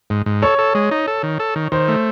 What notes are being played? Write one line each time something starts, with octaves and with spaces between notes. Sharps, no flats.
G#2
G#2
A4 C#5
A4
G#3
D#4
A4
D#3
A4
D#3
D#3 C5
A3